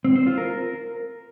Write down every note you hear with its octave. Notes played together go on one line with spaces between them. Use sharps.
C4
C5
F4
A#4